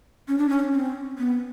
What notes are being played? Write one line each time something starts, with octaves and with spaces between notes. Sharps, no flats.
C#4
D4
C#4
C4
B3